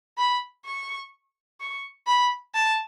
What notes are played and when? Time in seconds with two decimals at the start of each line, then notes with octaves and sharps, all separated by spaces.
0.18 B5
0.65 C#6
1.60 C#6
2.07 B5
2.54 A5